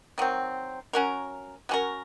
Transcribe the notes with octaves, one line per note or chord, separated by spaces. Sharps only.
D#3 F#3 C4
F#3 C#4 F#4 A#4
F#3 C#4 F#4 A#4